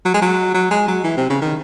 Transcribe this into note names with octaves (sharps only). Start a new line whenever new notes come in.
F#3
G#3
F#3
F#3
G#3
F#3
E3
C3
C#3
D#3